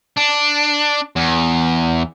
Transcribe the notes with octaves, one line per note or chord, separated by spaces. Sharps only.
D4
E2